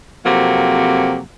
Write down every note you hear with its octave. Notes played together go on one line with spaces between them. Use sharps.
F2 C3 F#3 A#3